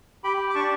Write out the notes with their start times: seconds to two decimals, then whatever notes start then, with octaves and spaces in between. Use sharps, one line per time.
0.24 G4 G5 B5
0.50 D6
0.55 D4 A5 C#6